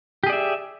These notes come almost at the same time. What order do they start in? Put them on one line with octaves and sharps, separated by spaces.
G4 G#4 D5 E5